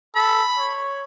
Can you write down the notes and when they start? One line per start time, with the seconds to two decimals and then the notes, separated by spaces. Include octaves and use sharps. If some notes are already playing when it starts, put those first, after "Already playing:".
0.15 A4 B5
0.58 C#5